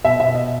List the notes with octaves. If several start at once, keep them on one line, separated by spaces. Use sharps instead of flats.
B2 E5
E5
B2
D#5